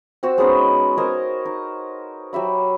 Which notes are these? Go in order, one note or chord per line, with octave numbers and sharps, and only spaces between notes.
C4 F#4 C5 E6
G#3 B3 C#4 D#4
A#4 C5 D#5 G#5
D#4
F#3 G4 E5 B5